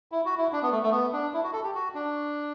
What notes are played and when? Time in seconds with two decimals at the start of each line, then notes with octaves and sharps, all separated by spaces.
0.12 E4
0.25 F#4
0.38 E4
0.53 D4
0.63 B3
0.72 A3
0.83 A3
0.92 B3
1.13 D4
1.34 E4
1.44 F#4
1.53 A4
1.64 G4
1.74 F#4
1.95 D4